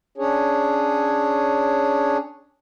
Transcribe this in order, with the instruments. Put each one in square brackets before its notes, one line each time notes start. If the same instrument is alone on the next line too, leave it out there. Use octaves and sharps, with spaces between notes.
[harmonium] C#4 D4 G#4 C#5